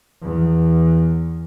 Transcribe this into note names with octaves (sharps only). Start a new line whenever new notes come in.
E2